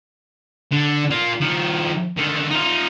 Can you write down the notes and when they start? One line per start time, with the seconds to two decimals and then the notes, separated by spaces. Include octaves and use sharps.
0.72 D3
1.11 F4 A#4
1.41 D#3 F3
2.17 D3 D#3
2.50 D#4 F4